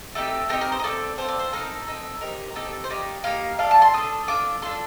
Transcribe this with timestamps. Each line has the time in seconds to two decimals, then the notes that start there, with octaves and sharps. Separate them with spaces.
0.15 A3 C4 D#4 G4 A4
0.49 A3 C4 D#4 G4 A#4
0.61 A#4
0.72 C5
0.79 D#5
0.84 C4 F4 A4 D5
1.18 C4 F4 A4 C5
1.28 D5
1.39 C5
1.52 C4 D#4 A4 A#4
1.87 C4 D#4 A4
2.21 C4 D#4 G4 A#4
2.55 C4 D#4 G4 A4
2.84 C5
2.90 A#3 D#4 G4 D5
3.24 A#3 D#4 G4 F5
3.59 D4 A4 F5
3.71 A5
3.82 C6
3.94 D4 A4 D#6
4.27 D4 F4 A4 D6
4.62 D4 F4 A4 C6